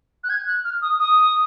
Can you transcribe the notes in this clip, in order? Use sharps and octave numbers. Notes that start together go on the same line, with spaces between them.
F#6
G#6
F#6
F6
D#6
D#6